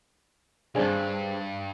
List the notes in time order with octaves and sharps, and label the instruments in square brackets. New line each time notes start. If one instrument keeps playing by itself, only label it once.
[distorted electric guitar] C2 G2 [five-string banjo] C4 D4 G#4